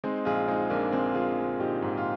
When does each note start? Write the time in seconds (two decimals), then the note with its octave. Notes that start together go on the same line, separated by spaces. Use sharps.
0.04 G#3 C4 D#4
0.25 A#1 F4 G#4
0.48 G#3 C4 D#4
0.70 A#1 A#3 D4
0.92 G#3 C4
1.15 G#3 F4 G#4
1.38 G#3
1.59 A#1 D#4 G4
1.82 G#2
1.97 F4